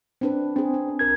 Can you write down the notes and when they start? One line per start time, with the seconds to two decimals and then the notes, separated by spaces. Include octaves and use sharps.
0.21 C4 D4 B4
0.56 C4 D4 G#4
0.74 D4
0.99 B1 A#4 G#6